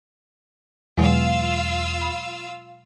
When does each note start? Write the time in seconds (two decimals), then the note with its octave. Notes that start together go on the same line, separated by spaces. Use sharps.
0.98 E2 B2 F#3 G#3 F4 F5 E6
2.02 B5